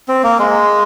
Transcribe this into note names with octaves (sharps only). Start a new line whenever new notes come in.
C4
A#3
G#3